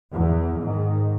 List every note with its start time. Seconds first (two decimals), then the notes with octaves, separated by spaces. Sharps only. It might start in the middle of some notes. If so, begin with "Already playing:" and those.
0.11 E2
0.60 G#2 D#3